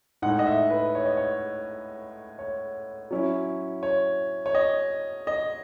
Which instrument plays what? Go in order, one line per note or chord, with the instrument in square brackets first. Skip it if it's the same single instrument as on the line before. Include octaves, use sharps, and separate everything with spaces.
[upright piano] A2 G#3 D#4 F#5
D#5
E5
B4
C#5
D#5
C#5
C#5
F#3 C#4 E4
C#5
C#5
D#5
D#5